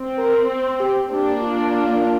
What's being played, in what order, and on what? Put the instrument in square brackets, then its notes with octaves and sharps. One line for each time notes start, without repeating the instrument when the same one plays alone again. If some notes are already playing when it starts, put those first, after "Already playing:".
Already playing: [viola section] C4
[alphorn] A#4
G4
[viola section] A#3 D4 [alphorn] G4
[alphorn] F4